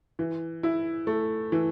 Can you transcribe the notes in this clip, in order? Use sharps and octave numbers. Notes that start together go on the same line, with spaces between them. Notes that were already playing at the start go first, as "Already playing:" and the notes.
E3
E4
A3
E3